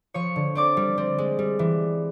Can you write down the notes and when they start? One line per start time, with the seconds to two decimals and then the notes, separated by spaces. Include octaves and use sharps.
0.14 F3 C#5 C#6
0.36 D3
0.55 C4 D5 D6
0.77 G3
0.98 C4
1.18 G#3
1.39 G3
1.59 E3